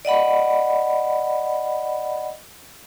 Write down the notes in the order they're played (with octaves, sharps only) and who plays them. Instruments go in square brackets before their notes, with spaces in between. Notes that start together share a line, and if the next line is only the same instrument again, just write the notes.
[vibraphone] D5 D#5 F#5 B5